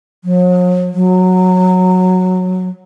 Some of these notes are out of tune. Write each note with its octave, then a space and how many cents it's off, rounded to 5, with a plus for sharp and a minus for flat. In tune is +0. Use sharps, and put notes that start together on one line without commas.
F#3 -45
F#3 -10